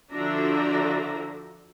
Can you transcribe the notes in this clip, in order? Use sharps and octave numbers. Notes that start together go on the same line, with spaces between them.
D3 F3 D4 F#4 E5 A#5